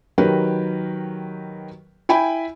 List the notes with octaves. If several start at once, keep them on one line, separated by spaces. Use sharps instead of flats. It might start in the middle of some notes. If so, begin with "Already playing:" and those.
D#3 F#3 G4 A#4 B4
E4 G5 G#5 B5